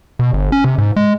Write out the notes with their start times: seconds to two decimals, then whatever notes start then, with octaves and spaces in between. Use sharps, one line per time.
0.19 B2
0.33 G1
0.52 C#4
0.64 C3
0.78 G#2
0.96 G#3